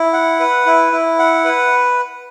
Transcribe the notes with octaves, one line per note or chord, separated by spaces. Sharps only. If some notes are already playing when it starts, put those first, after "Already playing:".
Already playing: E4
F#5
B4
E4
E4
F#5
B4